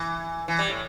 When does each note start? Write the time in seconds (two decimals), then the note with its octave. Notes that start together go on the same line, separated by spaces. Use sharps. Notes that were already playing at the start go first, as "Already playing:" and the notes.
Already playing: E3
0.48 E3
0.59 G3
0.69 A2